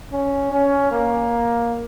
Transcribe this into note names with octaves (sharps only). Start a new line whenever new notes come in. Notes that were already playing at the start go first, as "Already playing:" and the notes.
C#4
C#4
A#3